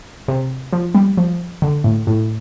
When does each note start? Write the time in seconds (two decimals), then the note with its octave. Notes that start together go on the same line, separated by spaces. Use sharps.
0.28 C3
0.73 F3
0.95 G3
1.18 F3
1.62 D3
1.84 A2
2.07 A2